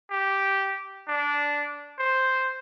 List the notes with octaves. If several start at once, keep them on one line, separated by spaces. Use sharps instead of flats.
G4
D4
C5